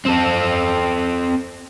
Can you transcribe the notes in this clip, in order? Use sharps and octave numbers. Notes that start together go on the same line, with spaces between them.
C4 A4